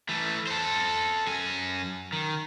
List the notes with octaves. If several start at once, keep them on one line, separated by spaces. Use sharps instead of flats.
E3 A3
A4 C5
F#2 G#5
D#3